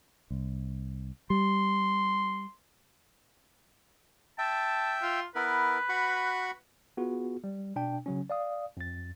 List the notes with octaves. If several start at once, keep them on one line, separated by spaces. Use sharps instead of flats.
C2
G3 C6
E5 G5 A5
F4
B3 E4 A#4 B4
F#4 B5 C#6
B3 F4 F#4 G#4
G3
B2 D4 G5
C#3 F#3 C#4
D5 F5 D#6
F2 A6